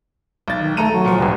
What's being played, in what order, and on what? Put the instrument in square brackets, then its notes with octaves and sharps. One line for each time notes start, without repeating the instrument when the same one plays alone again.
[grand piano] B1 A6
[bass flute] D#3
[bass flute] A3 [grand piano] A4 A#5 D#7
[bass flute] F#3
[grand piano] A#2 F3
[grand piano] D1 G1 [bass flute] G3